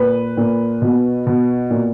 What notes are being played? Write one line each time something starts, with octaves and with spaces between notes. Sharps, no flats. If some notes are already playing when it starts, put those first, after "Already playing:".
Already playing: A#2 B4
A#2
B2
B2
A#2